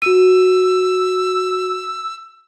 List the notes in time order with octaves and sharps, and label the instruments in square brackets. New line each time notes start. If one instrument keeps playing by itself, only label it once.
[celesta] F#4 D#7 [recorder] E6